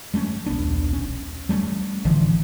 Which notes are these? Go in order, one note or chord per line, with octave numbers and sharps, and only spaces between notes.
G#3 A3 B3 C#4
D#1 B1 B3 D4
C#4
G3 A3 A#3 C#4
A1 D3 E3 F3